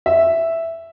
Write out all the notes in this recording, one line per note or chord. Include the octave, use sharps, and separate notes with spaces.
E5